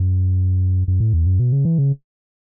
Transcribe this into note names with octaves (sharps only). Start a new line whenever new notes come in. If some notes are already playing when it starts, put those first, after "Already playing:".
Already playing: F#2
F#2
A2
E2
F#2
B2
C#3
E3
C#3